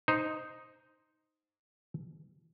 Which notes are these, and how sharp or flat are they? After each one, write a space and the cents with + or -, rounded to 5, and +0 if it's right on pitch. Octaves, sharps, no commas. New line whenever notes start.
D#4 +0 C5 +0